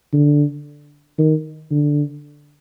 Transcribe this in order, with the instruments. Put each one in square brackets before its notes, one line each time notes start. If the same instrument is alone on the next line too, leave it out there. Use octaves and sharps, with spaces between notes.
[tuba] D3
D#3
D3